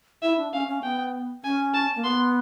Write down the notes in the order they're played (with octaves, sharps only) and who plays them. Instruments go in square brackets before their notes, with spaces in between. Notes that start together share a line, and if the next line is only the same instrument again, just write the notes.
[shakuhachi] E4 [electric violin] E5
[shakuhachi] D4
[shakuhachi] C#4 [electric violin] F5
[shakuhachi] C#4
[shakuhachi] B3 [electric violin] G5
[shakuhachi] C#4 [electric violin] G#5
[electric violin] A5
[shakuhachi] A#3
[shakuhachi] B3 [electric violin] C6